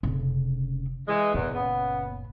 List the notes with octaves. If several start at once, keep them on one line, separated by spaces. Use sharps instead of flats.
F1 C#3
E3 G#3
F#1 E2 A#2
C#3 B3